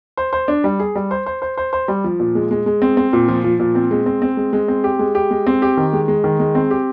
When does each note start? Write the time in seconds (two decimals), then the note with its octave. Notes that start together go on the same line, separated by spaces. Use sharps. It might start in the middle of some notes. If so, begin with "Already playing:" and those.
0.17 C5
0.33 C5
0.48 D4
0.64 G3
0.80 G#4
0.95 G3
1.11 C5
1.26 C5
1.42 C5
1.57 C5
1.73 C5
1.88 G3
2.04 F3
2.20 A#2
2.35 G#3
2.51 G#3
2.66 G#3
2.82 C4
2.97 C4
3.13 A#2
3.28 F3
3.44 F3
3.60 A#2
3.75 C4
3.91 G#3
4.06 C4
4.22 C4
4.37 G#3
4.53 G#3
4.68 C4
4.84 G4
4.99 G#3
5.15 G4
5.31 G#3
5.47 C4
5.62 G4
5.77 D#3
5.93 G#3
6.08 G#3
6.24 D#3
6.40 G#3
6.55 C4
6.71 G4